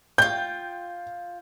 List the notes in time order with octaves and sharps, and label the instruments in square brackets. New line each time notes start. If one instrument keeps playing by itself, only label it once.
[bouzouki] F4 G5 [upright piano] G6